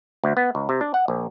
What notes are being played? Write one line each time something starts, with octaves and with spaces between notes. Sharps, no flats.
D2
B3
C#2
C3
D4
F#5
A#1